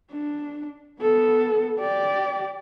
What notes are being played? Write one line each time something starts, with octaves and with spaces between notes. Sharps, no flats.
D4
B3 A4
G4 D5